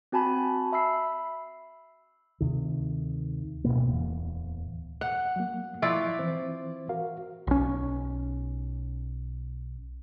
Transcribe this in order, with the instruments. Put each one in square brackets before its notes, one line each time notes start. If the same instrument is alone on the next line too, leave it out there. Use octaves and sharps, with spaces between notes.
[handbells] C4 F#4 G#5 A5 B5
E5 B5 E6 C7
[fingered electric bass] D2 C3 D#3
D1 G1 B2 A#3
D1 E2
[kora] F#5
[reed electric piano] F#3 A#3
[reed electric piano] F3 C#6 F#6 [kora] E4 F4 D5
[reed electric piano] E3 C4 C5
F#4 A#4 F5
[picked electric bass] B1 C#4